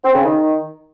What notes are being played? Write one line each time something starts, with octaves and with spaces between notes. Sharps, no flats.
C4
C#3
D#3